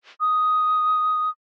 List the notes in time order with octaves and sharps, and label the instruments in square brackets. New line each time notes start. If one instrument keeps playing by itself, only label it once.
[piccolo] D#6